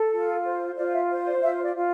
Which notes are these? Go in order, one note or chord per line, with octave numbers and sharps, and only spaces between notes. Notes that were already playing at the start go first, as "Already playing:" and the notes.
Already playing: A4
F4
C5
F4 D5
E5
C5
D5
F4 E5
D5
F4